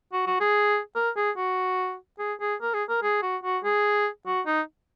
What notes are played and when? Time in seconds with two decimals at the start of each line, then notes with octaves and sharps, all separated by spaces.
0.12 F#4
0.27 F#4
0.40 G#4
0.95 A#4
1.16 G#4
1.37 F#4
2.19 G#4
2.40 G#4
2.61 A#4
2.74 G#4
2.89 A#4
3.03 G#4
3.22 F#4
3.44 F#4
3.64 G#4
4.26 F#4
4.46 D#4